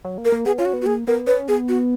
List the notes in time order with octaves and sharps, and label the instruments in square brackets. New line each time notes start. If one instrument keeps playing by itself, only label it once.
[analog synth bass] F#3
A#3
[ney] A#4
[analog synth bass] A#3
[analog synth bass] B3 [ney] G#4
[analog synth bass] C#4 [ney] F4
[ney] F#4
[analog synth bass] B3
[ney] F#4
[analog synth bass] A#3 [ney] G#4
[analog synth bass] B3 [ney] A#4
[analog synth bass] C#4 [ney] B4
[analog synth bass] B3 [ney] G#4
[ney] F#4